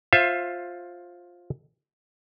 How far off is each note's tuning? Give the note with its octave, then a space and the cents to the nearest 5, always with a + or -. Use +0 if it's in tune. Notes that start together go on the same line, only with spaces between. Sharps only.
F4 +10 C5 +20 E5 +25